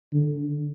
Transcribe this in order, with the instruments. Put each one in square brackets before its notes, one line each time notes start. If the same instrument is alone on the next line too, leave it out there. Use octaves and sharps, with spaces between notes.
[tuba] D3